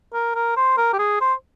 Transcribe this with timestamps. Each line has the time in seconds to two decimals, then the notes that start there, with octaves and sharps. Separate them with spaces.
0.13 A#4
0.35 A#4
0.57 C5
0.78 A#4
0.93 G4
0.99 G#4
1.21 C5